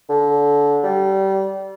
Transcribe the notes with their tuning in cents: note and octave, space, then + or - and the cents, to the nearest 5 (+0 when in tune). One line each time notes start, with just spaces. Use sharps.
D3 -25
G3 -25